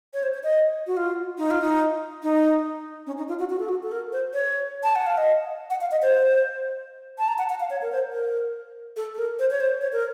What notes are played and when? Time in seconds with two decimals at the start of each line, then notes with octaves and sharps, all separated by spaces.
0.14 C#5
0.23 C5
0.34 C#5
0.43 D#5
0.87 F#4
0.97 F4
1.38 D#4
1.51 F4
1.62 D#4
2.23 D#4
3.07 C#4
3.18 D#4
3.28 F4
3.39 F#4
3.50 F#4
3.59 A4
3.69 F#4
3.83 A4
3.92 A#4
4.12 C5
4.33 C#5
4.83 A5
4.95 F#5
5.07 F5
5.17 D#5
5.70 F#5
5.81 F5
5.91 D#5
6.02 C5
7.18 A5
7.28 A#5
7.38 F#5
7.50 F#5
7.60 F5
7.70 C#5
7.82 A#4
7.92 C5
8.13 A#4
8.96 A4
9.14 A4
9.18 A#4
9.39 C5
9.51 C#5
9.60 C5
9.81 C#5
9.93 A#4